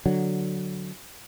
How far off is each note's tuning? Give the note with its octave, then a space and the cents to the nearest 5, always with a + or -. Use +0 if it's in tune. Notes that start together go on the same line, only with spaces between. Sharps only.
D3 +0 F#3 +0